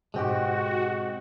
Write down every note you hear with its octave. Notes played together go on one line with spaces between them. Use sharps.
G#2 B2 G#3 C4 F#4 G4